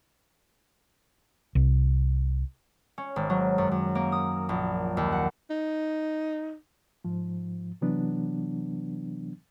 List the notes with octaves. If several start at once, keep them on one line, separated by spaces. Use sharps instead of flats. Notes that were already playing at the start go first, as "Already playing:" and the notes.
C2
C#4
G#1
F#3
F#2
F#2
A#3
D#6
A#1
D#2
F#5
D#4
G#2 F3
C3 E3 F#3 B3 D4